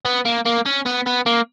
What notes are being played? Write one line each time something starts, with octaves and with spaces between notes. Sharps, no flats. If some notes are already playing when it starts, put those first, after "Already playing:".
B3
A#3
A#3
C#4
B3
B3
A#3